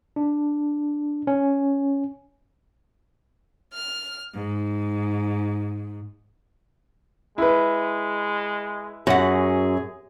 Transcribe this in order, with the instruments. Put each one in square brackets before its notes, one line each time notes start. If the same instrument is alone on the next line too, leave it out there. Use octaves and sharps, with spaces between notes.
[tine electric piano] D4
C#4
[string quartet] F6
G#2
[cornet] G#3 [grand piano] E4 B4
[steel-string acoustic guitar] F#2 [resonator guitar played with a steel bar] F#4 F#5 [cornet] G#4